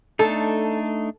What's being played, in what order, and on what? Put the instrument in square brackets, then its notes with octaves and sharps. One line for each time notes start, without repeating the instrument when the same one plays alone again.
[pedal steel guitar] A3 D4 D#4 [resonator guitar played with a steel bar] A4